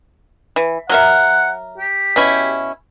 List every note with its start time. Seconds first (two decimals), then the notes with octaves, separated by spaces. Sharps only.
0.56 E3
0.89 F#3 A#4 E5 F#5
1.78 G4
2.16 B2 C#4 E4